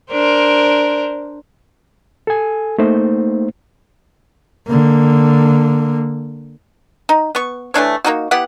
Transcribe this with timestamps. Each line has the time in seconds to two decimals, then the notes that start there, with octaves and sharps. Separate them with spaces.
0.12 D4 A#4 C5
2.27 A4 G#5
2.78 A3 A#3 D#4 C5
4.67 D3 A#3
7.09 D#4
7.35 B3 C#6
7.74 E3 A3 D4 C#5
8.05 A#3 C#4 D#4 F#4
8.31 B3 E4 G4 F#5